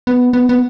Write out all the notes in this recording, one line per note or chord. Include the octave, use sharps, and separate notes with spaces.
B3
B3
B3